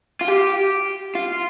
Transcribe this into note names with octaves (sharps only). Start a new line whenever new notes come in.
F4
G4
F4